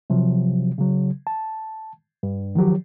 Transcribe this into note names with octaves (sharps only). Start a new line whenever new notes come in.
C3 F3 F#3
C#3 F#3
A5
G2
D#3 F3 F#3 G4